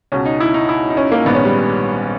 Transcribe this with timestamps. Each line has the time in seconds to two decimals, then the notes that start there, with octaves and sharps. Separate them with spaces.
0.12 C#2 B2 C#4
0.26 D#4
0.40 E4
0.54 D#4
0.69 E4
0.90 D#4
0.97 C#4
1.12 A#3
1.25 A#1 G#2 D#3 B3
1.35 C#4
1.45 G3